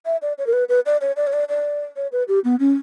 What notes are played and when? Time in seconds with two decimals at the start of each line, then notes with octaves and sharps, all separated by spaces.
0.06 E5
0.22 D5
0.38 C#5
0.47 A#4
0.53 B4
0.69 B4
0.86 D5
1.01 C#5
1.17 D5
1.27 C#5
1.33 D5
1.49 D5
1.96 C#5
2.12 B4
2.28 G4
2.44 B3
2.60 C#4